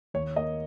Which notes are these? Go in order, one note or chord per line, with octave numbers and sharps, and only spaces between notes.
D#2 C#5
A#3 D#5